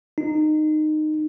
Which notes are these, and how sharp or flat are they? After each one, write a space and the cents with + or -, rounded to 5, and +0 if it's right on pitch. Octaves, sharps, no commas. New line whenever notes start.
D#4 -20